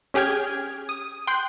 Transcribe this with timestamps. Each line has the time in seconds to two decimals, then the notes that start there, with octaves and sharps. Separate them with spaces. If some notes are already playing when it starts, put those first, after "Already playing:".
0.14 C#4 G4 G#4 G5 F6 G#6
0.89 D#6
1.27 G5 C6 F#6 G6